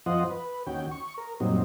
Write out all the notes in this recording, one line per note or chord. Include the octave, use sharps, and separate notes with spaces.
F2 F3 F4 C5 D#5 F#5
B4
D#2 C#4 F#4 G5
C#6
A#4
F#2 A#2 F#3 G3 C4 D#4